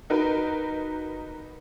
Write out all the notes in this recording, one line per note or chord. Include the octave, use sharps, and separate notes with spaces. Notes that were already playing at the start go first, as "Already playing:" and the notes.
D#4 F#4 A#4 B4